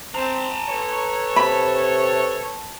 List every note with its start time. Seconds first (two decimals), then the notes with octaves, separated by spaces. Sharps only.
0.15 C4 A5 A#5
0.69 A4 B4 C#5
1.36 C3 B5